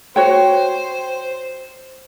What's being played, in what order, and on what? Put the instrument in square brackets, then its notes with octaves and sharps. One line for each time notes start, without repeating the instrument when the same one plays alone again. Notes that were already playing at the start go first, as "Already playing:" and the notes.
[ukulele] F#4 C#5 G5 [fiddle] C5